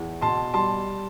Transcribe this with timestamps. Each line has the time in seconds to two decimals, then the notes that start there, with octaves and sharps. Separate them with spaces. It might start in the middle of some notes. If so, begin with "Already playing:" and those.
Already playing: E2
0.21 B2 A5 C6
0.54 G3 A5 C6